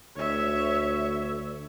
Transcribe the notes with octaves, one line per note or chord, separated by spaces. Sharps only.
D2 C#5 E5